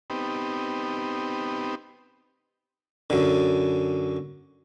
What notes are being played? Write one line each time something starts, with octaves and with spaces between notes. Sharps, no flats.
B3 C4 D#4 G4
F#2 D3